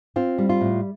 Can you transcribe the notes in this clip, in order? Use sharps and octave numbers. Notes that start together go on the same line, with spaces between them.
C4 F4
G3
F4
A2